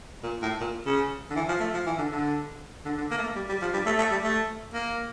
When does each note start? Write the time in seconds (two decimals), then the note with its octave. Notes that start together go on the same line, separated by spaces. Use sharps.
0.23 A#2
0.42 A2
0.60 A#2
0.86 C#3
1.30 D3
1.36 E3
1.48 F3
1.60 A3
1.74 F3
1.86 E3
1.98 D3
2.11 D3
2.85 D3
2.98 D3
3.11 A#3
3.18 A3
3.23 A#3
3.35 G3
3.49 G3
3.61 F3
3.73 G3
3.86 A3
3.98 A3
4.11 G3
4.23 A3
4.74 A#3